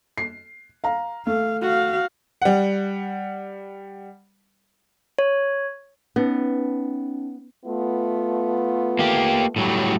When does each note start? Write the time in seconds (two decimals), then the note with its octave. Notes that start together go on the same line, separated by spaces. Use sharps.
0.18 C7
0.84 F5 A#5
1.27 A3 F5
1.61 F#4 F5
2.42 G3 F#5
5.19 C#5
6.16 B3 C#4 D#4
7.65 A3 B3 F4
8.99 A#3 G4
9.56 A2 F#3 G3